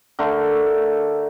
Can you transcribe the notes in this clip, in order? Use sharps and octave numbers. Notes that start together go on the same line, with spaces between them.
D3 A3 A#4